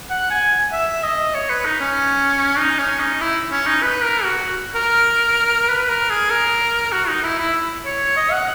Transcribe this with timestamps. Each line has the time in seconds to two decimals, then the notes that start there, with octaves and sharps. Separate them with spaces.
0.10 F#5
0.31 G#5
0.72 E5
1.03 D#5
1.35 C#5
1.50 B4
1.66 D#4
1.81 C#4
2.58 D#4
2.79 C#4
3.00 D#4
3.21 E4
3.51 C#4
3.67 D#4
3.83 B4
4.03 A#4
4.24 F#4
4.75 A#4
5.68 B4
5.90 A#4
6.10 G#4
6.31 A#4
6.93 F#4
7.08 D#4
7.23 E4
7.39 E4
7.86 C#5
8.17 D#5
8.32 F#5